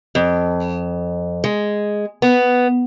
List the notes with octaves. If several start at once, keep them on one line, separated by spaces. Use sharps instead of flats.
F2
G#3
B3